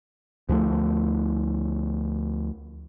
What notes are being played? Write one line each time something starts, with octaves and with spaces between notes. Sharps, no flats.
D2 F3 G3 A3